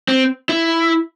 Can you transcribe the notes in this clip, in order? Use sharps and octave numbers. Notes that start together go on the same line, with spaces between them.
C4
E4